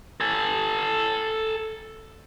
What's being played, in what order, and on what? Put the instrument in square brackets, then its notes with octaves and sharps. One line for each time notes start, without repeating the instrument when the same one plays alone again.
[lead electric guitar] A4 G#5